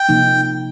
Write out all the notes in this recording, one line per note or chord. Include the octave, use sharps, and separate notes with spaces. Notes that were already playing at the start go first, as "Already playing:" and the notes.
Already playing: G5
C3 F3 A#3 D#4